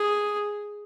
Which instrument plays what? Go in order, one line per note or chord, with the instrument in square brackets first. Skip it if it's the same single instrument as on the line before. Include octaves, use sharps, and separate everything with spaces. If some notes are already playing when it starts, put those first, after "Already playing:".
Already playing: [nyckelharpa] G#4